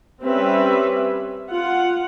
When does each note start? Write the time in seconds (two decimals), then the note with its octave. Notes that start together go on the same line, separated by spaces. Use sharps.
0.22 G3 C4 C#4 G4 B4 E5
1.49 F4 F#5